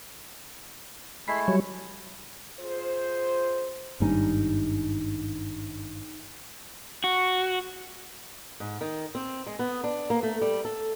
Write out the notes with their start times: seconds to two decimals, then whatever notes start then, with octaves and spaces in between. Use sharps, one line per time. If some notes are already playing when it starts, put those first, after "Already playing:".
1.28 G#3 A3 E4 B5 C6
1.48 F#3 G3 C#5
2.59 F4 G#4 C5
4.00 G#1 G2 C#4 D#4 G#5
7.04 F#4
8.60 G#2
8.81 D#3
9.15 C4
9.47 G#3
9.59 B3
9.84 D4
10.10 A#3
10.23 A3
10.41 G3
10.65 A4